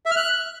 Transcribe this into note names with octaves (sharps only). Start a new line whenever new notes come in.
E5
F6
F#6